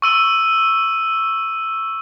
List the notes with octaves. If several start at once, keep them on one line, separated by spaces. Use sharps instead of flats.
C#6 E6 D#7 G7